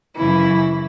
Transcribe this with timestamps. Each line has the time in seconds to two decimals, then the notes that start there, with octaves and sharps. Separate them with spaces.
0.16 F#2 C#3 E3 E4